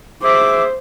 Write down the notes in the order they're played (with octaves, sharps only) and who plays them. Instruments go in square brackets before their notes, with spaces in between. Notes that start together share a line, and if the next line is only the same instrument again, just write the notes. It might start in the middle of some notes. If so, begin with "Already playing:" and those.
[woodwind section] G#4 E5 D6 [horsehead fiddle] C5